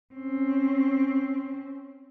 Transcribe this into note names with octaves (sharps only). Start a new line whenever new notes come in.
C4 C#4